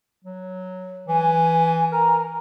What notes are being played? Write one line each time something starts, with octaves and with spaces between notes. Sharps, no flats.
F#3
E3 G#5
A#4 A#5